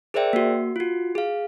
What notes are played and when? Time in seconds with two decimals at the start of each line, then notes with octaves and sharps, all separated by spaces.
0.14 G#4 A#4 C5 D5 E5 G5
0.33 A#3 F#4
0.76 F4 F#4
1.15 G#4 F5